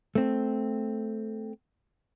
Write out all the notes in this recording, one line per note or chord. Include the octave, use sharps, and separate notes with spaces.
A3 C4